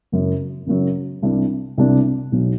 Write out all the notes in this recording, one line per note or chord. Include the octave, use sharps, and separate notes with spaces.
F#1 F#2 F#3
F#1 F#2 F#3
C2 C3 G3 D4
C2 C3 G3 D4
B1 B2 F#3